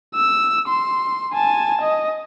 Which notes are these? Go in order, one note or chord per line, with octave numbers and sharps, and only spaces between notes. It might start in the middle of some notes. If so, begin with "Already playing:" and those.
E6
C6
G#5 A5
D#5